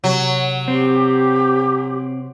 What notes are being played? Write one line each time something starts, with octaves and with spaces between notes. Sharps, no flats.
C3 F#3
C4 G4